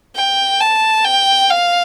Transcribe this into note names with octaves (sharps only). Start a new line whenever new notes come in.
G5
A5
G5
F5